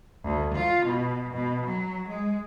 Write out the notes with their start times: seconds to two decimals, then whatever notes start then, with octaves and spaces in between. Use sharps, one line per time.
0.24 D2
0.55 F4
0.86 B2
1.33 B2
1.66 F#3
2.09 G#3